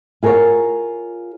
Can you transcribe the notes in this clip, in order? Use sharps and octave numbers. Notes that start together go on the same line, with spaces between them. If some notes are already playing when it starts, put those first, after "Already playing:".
F4 G#4 A#4 B4 C#5 F#5